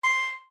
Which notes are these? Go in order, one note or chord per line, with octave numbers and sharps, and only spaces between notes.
C6